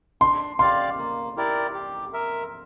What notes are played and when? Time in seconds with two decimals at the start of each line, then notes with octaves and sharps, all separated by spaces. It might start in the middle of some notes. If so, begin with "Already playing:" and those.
0.21 D4 C6
0.59 G4 D5 F5 C6
0.98 A#3
1.37 E4 G4 A#4 D5
1.74 G4
2.13 A#4 E5